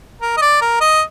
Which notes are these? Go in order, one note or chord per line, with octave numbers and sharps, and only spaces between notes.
A#4
D#5
D5
A#4
D#5